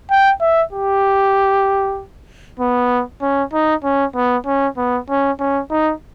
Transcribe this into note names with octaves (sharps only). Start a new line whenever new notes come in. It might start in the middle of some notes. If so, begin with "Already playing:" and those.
G5
E5
G4
B3
C#4
D#4
C#4
B3
C#4
B3
C#4
C#4
D#4